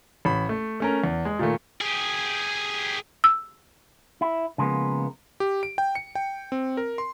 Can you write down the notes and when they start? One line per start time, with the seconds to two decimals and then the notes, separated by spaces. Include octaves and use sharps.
0.25 A1 B5
0.49 A3
0.80 A3 C#4 A#4
1.04 E2
1.25 G#3
1.39 A#2 D#3 A3
1.81 G4 G#4
3.24 E6
4.21 E4
4.58 C#3 F3 G#3 A#3 B3
5.40 G4
5.63 D7
5.78 G5
5.95 C#7
6.15 G5
6.52 C4
6.77 A#4
6.98 C6